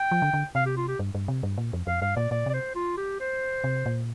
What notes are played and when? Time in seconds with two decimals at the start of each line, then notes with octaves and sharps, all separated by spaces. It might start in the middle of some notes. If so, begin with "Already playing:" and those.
Already playing: G5
0.11 F3
0.22 D3
0.34 D3
0.55 C3 F5
0.66 G4
0.77 F4
0.88 G4
0.99 G2
1.15 G2
1.28 C3
1.43 G2
1.58 A#2
1.73 F2
1.87 F2 F5
2.02 G2 F5
2.16 A#2 D5
2.31 A#2 D5
2.46 C3 D5
2.53 C5
2.75 F4
2.97 G4
3.20 C5
3.64 C3
3.86 A#2